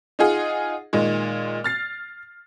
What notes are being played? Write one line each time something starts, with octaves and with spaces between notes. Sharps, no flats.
D#4 F4 G#4 F#5
A#2 D#3 G#3
F6 A6 C7